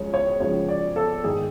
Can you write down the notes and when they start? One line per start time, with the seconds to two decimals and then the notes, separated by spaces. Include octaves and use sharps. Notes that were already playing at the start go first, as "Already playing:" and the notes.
Already playing: C#2 C#3 F3 G#3 C#5
0.14 C#5
0.40 C#2 C#3 F3 G#3 C#5
0.68 D5
0.96 A4
1.24 G#2 D#3 G#3 G#4